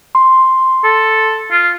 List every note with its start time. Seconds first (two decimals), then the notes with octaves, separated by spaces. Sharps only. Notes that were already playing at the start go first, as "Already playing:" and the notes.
0.15 C6
0.84 A4
1.51 F4